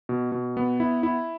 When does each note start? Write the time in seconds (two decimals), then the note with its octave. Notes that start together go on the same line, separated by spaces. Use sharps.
0.09 B2
0.32 B2
0.57 B3
0.80 E4
1.03 E4